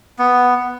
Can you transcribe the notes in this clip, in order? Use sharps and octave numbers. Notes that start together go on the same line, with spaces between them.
B3